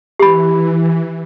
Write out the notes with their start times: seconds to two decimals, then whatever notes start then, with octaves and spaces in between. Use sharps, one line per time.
0.19 E3 G4 B5